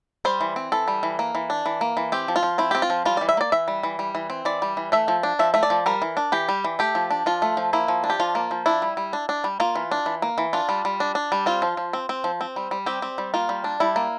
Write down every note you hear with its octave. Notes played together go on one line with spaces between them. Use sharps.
G3 C5
E3
C4
E3 A4
G3
E3
A#3
E3
D4
E3
A#3
E3
C4 G4
F3
F4
F3
C4 E4
C4 G4
F4
F3
G3 F4
E3 D5
E5
A#3 D5
E3 E5
G3
E3
G3
E3
C4
E3 D5
G3
E3
A3 E5
F3
D4
F3 E5
A3 E5
D5
F3
G3 A#4
E3
D4
E3 G4
G3
E3
A3 G4
F3
D4
F3 F4
A3
F3
A#3 E4
F3
D4
G4
F3 F4
A#3
F3
D4 E4
G3
G3
D4
D4
G3
A#3 F4
E3
D4
E3
A#3
E3
D4 F4
G3
G3
D4
D4
G3
C4 F4
F3
F3
C4
C4
F3
C4
G3
G3
C4 G4
C4
G3
A#3 F4
G3
D4
G3 E4
A#3